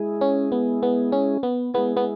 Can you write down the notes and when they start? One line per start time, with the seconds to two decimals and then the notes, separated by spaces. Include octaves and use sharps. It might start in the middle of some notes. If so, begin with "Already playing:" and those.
Already playing: G#3 E4 G#4
0.21 C#4
0.52 B3
0.83 B3
1.12 C#4
1.43 B3
1.74 G#3 B3 E4 G#4
1.97 B3